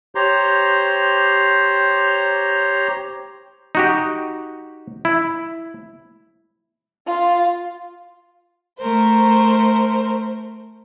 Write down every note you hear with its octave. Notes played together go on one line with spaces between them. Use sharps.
G4 C5 C#5 A#5 C6
D#4 F#4 G4
E4
F4
A3 A#4 C5